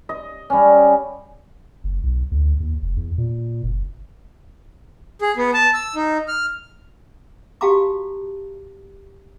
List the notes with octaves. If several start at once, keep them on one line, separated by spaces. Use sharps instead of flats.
D#5
G3 C#4
F#1
B1
D2
D#2
F1
E2
A#2
F#1
G#4
B3
A5
E6
D#4
F6
F#4 G4 F5 A5 A#5 D6